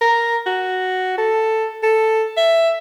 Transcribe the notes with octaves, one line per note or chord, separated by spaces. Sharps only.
A#4
F#4
A4
A4
E5